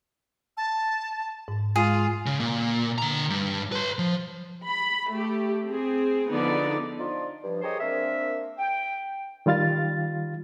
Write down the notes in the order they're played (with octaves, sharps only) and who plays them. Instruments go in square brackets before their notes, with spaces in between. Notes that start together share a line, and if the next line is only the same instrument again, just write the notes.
[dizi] A5
[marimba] G#2
[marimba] G#3 [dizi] F4 [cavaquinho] G#4
[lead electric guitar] C#3
A#2
D3 A#5
G2
B4 C6
F3
[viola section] B5
A3 G4
C4 G#4
D3 F3 B3 D#4 D5
[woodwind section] F3 D4 D#4 F4
G2 F3
G4 G#4 A#4 C5 C#5 D#5
A#3 C4 D4 A#4 E5
G5
[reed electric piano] D#3 G3 F4 F5 A6